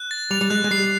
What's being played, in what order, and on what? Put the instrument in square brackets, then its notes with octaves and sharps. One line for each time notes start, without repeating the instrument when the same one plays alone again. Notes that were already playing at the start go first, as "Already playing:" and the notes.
Already playing: [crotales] F#6
A6
[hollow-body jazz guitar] G3 [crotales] F7
[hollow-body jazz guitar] G3
[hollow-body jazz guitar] G#3 [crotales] F#6
[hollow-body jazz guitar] G#3
[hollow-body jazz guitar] G3 [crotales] C7